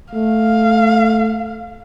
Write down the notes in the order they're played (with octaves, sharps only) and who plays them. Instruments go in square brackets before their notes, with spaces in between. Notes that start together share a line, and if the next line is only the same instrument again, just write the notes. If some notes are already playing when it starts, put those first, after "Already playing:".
[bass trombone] A3 [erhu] F5